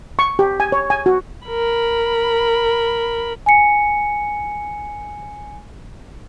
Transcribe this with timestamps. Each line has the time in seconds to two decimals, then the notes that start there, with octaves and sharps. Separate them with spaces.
0.19 C#6
0.39 G4
0.60 G#5
0.72 C#5
0.90 G#5
1.06 F#4
1.47 A#4 B5
3.46 G#5 C#7